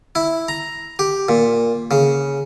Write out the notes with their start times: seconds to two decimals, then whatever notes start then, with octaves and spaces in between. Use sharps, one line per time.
0.15 E4
0.48 A#5
0.99 G4
1.29 A#2
1.91 C#3